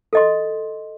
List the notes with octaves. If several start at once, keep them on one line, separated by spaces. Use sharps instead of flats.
A4 D#5 C6